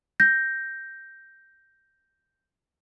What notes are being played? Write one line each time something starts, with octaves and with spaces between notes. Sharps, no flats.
G6 A#6